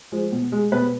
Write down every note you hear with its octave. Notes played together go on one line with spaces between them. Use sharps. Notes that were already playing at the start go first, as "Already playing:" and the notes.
F3 G#3
B2
G#3
B2 B4